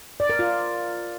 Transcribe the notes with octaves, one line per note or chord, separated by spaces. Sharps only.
D5
A#4
F4